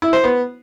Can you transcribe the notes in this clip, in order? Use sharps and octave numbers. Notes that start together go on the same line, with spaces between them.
E4
C5
B3